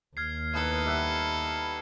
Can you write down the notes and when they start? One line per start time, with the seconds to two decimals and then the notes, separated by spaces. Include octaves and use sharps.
0.17 D#2 F6 G#6 C7
0.53 A2 B3 D#4 A4 B4
0.85 G3 E5 F#5